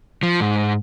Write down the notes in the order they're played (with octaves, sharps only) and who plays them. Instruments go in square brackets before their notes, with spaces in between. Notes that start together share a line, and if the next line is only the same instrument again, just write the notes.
[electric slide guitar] F3
G#2